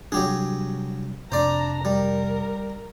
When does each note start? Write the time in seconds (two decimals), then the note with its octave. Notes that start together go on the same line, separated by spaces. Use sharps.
0.12 C3 F#3 G3 D4 G4 G#4
1.32 F2 C3 D4 C5 D5 A#5
1.85 G3 A#4